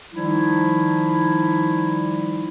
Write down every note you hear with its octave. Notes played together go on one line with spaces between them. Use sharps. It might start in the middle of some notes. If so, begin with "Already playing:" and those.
D#3 F3 G3 D#4 E4